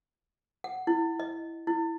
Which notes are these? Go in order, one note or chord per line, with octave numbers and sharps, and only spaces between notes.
F#5
E4
D#5
E4